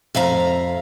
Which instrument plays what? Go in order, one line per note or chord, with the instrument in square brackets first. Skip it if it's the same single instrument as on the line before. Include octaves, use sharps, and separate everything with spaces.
[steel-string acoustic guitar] F2 E5 F5 A#5